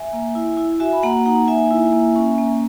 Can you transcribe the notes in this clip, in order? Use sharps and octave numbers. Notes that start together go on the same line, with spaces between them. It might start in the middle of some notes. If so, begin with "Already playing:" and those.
Already playing: E5 G#5
A#3
E4
E4
F#4 E5 G#5
B5
A#3 F#5 A#5
D#4 F#5 A#5
A#3 E5 G#5
E4
A#3
C#4
A#3